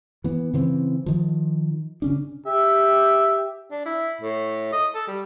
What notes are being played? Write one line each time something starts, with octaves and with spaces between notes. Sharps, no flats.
E3 B3
C#3 E3 C4
D#3 F3
C#3 C#4 D4
G4 E5
D4
E4
A2
D#5
A4
G3